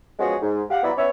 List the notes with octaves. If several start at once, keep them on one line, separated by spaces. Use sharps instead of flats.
F3 G#3 B3 C#4 F#4 G#4
G#2
G4 F5 F#5
F#3 B3 E4 D5 A#5 B5
B3 C#4 C#5 E5